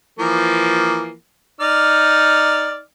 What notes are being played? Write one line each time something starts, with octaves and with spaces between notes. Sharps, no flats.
E3 F3 A#3
D#4 D5 F6